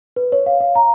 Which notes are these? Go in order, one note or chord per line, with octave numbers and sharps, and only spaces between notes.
B4
C#5
F5
F5
A#5